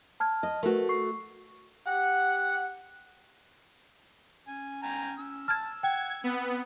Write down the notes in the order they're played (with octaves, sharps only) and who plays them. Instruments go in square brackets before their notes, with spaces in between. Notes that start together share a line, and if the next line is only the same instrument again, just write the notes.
[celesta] A5 F6 G#6
[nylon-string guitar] D#5
[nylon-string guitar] A3 F#4 [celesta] A#4 B4
[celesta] C#6 C7
[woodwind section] G4 F#5
[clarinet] C#4 [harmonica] G#5
[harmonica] G5 G#5 A#5
[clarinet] C#4 [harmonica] E6
[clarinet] A5 [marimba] F6 G#6
[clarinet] F#5 [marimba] G5 [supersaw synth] G#6
[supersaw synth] B3 [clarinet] C4